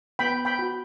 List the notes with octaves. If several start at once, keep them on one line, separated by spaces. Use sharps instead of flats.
B3 G5 B5
G5 B5
F#4